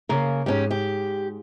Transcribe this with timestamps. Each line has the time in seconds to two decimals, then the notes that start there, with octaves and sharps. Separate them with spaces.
0.09 C#3 A#3 A#4
0.46 G#2 C#4 G4
0.71 G4